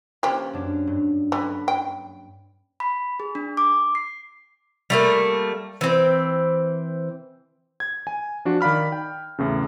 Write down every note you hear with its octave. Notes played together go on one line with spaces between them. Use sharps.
F3 A#3 C#4 G4 B4
F#2 D4
G2
D3 B4 B5
G5
B5
G#4
D4
D6
C7
G3 A3 A#3
E3 C4
G#6
G#5
F3 D4 F#4
D#3 D5 F5 B5 F6
G5
E2 A2 C#3